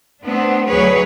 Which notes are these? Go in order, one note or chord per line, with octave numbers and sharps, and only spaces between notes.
A3 B3 C4 D4
D2 F#3 G#4 B4 C#5